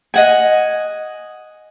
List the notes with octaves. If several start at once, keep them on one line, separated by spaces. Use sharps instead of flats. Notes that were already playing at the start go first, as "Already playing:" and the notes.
D#5 F#5 G#5